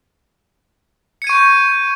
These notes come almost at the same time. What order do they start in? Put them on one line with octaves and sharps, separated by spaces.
C#7 G#6 D#7 C#6 G6